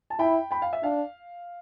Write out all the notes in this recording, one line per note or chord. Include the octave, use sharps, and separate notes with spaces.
A5
E4 G5 B5
G5 B5
F5
E5
D4 F5